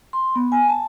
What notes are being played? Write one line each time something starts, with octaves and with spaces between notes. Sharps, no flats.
C6
B3
G#5
A5